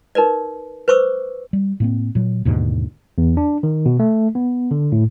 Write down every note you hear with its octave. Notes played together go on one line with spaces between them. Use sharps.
D#4 A#4 B4 D5
B4 C5 C#6 D6 E6
G3
A2 A#3 C4
A#2 F#3
D#2 G#2 B2 D3
E2
D4
D#3
B2
A3
B3
D3
A2